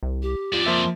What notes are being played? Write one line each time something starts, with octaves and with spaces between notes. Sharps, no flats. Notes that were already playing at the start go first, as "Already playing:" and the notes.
C2
G4
F2 F4 D5
F3 A#3 E5 C6